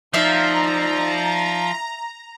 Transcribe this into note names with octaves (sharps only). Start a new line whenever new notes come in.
F3 D#4 D5 E5 F5 A#5